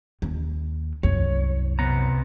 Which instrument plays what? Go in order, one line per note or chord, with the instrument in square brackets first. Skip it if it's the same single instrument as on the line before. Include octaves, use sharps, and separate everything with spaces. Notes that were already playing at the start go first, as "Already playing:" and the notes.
[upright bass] D#2
[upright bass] C2 F#2 [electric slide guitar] C#5
[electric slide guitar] C3 B3 A#5